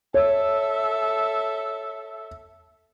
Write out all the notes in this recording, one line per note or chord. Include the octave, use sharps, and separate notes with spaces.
A4 C#5 E5